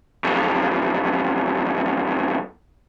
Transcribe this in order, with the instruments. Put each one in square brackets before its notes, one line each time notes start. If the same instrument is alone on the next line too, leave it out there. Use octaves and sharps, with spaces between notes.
[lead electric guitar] B1 F2